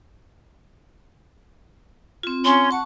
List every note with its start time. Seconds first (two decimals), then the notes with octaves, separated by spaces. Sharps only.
2.23 C4 F4
2.45 C#4 C6
2.71 F#5 A5 C#6